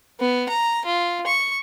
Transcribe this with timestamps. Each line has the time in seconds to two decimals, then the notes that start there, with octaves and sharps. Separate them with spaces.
0.20 B3
0.49 A#5
0.85 F4
1.27 C#6